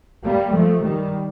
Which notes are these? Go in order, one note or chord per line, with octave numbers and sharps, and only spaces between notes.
G3 A#3
F3 A3
D#3 G3